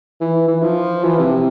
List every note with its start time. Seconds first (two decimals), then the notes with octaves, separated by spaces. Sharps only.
0.21 E3
0.48 E3
0.62 F3
1.04 E3
1.19 C3